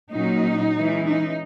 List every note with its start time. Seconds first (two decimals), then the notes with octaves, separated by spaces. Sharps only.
0.11 A#2 F#3 C#4 D#4
0.74 E3 G#3 C#4
1.05 D#4